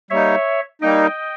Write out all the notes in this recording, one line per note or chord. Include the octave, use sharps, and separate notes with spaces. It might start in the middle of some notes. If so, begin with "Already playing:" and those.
G3 A#3 D#4 C#5 E5
G3 A#3 D#4 D#5 G5